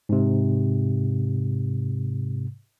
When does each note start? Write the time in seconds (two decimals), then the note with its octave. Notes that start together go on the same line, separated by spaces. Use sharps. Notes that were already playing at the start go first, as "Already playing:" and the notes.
0.09 G#2 C3